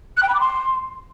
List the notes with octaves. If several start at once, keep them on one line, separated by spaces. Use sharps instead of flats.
F#6
G5
B5
D6
C6